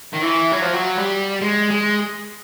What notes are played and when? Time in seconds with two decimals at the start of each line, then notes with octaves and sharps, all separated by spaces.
0.13 D#3
0.22 E3
0.52 F#3
0.62 F3
0.73 F#3
0.97 G3
1.42 G#3
1.71 G#3